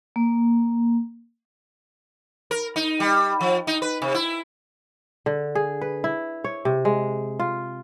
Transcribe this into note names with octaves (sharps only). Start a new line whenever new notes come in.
A#3
A#4
D#4
G3
F3
D#4
B4
C3
E4
D3
G#4
B4
E4
C#5
C3
G#3
F4